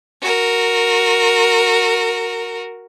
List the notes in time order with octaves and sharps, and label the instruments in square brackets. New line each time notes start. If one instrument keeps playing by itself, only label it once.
[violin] F#4 A#4